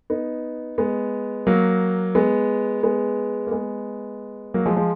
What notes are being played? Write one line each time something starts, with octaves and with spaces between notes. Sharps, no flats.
B3 D#4
G#3 B3
F#3 A#3
G#3 B3
G#3 B3
A#3
G#3 B3
F#3 A#3
F3 G#3
F3 G#3